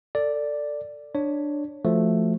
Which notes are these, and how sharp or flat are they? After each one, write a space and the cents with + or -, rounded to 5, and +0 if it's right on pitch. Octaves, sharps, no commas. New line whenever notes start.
A4 +25 D5 +0
D4 +10 C#5 +0
F3 -10 A3 +0 F#4 -10